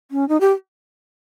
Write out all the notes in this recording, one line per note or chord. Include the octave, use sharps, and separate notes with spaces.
C#4
D#4
G4